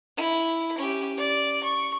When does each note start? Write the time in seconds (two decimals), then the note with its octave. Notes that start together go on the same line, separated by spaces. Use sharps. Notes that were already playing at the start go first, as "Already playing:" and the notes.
0.17 E4
0.78 C#4 G4
1.17 D5
1.64 C#6